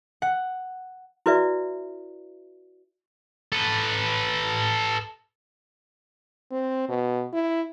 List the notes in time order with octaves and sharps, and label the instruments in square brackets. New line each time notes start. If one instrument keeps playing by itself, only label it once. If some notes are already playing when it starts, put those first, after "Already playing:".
[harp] F#5
[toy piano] E4 F#4 B4 D5 E5
[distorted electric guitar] A4 B4
[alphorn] C4
B2
E4